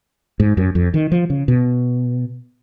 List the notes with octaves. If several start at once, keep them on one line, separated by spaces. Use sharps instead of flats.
G#2
F#2
F2
D#3
F3
C#3
B2